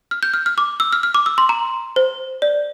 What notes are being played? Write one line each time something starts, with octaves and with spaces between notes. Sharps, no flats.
F6
G6
F6
F6
D6
E6
F6
F6
D6
E6
C6
A#5
C5
D5